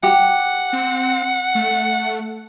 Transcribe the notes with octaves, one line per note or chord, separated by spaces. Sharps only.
G4 F#5
C4
A3